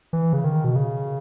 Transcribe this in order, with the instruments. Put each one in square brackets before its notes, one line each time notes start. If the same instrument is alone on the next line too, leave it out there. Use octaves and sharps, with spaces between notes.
[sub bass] E3
C#3
D#3
B2
C#3